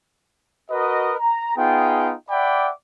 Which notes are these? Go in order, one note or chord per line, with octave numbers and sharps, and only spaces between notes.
F#4 A#4 B4 D#5
A#5
B3 D#4 F4 G#4 G5
D5 E5 F#5 G5 B5 D6